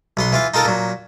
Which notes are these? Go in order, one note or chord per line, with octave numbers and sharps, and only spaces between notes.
B1 B3 C6
E3 F4 F5
D#4 F4 A4 A#4 F5
A#2 F#3